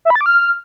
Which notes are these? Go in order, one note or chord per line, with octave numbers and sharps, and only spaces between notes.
E5
B5
A6
D6
F6